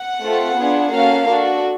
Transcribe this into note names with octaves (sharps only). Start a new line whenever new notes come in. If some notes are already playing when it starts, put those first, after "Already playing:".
Already playing: F#5
A3 C4 F4 A4
B3 D4 F4 G#4
A#3 C#4 F#4 A4 F5
D4 F#4 A4